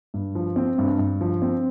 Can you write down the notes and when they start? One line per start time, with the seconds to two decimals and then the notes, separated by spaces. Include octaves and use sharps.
0.14 G2
0.35 F3
0.56 C4
0.78 G2
0.99 G2
1.21 F3
1.42 C4